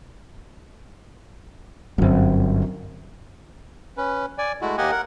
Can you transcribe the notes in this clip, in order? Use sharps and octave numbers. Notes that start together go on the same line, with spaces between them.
D1 G1 F#2 C4
C#4 B4
D5 G#5
G#3 A3 E4 F#4
D#2 A#3 G4 D#5 F#5 G#5
A#4 F#5